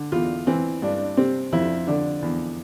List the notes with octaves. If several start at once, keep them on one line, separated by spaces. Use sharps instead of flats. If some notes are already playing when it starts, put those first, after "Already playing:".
Already playing: D3
E2 F4
E3 C4
G2 D4
C3 C4
F2 E4
D3 D4
E2